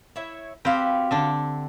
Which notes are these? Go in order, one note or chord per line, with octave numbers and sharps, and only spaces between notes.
E4 C#5 E5
C4 F#4 G4 B4 F5
D3 D4 E5